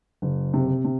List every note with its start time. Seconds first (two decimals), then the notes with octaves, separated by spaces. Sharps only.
0.22 F#1
0.54 C3
0.85 C3